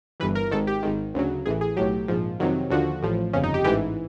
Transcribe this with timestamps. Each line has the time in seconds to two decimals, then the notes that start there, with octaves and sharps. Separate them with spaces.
0.20 G1 G2 E3 B4
0.35 A#4
0.51 G#1 G#2 D#3 A4
0.67 G4
0.83 G#1 G#2 D#3
1.14 D2 C#3 F#3
1.46 A1 A2 E3 G#4
1.61 G#4
1.77 B1 A2 F#3 G4
2.08 A#1 G#2 F3
2.40 F2 C3 D#3 F#3
2.70 D#2 D3 F3 F#4
3.03 A1 A2 F3
3.33 G1 F2 C#3 C#4
3.44 D#4
3.54 G4
3.64 A1 G#2 E3 G4